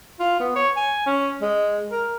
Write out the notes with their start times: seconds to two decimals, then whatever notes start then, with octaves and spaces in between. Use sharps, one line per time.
0.20 F4
0.40 B3
0.56 C#5
0.77 G#5
1.06 C#4
1.42 G#3
1.91 A#4